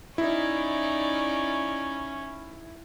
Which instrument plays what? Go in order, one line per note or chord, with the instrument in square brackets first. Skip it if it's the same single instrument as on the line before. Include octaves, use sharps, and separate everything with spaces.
[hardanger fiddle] C#4 [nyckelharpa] D#4 D5 [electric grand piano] E4